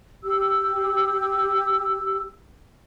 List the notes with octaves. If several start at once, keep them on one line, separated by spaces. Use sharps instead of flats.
G4 E6